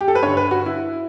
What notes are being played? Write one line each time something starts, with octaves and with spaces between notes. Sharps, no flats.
G4
A4
B4
G2 D3 C#5
B4
F#4
E4